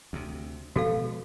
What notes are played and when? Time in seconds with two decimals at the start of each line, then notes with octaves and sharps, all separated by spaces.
0.13 D2 C3
0.76 B2 F3 G#3 F#4 A4 F5